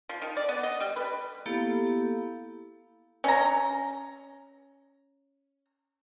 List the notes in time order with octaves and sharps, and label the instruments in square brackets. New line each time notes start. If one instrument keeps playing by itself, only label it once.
[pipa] F3
D#3
D5
B3
D#5
G3
B4
[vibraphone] A#3 B3 E4 G4 A4 F5
[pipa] C#4 A#5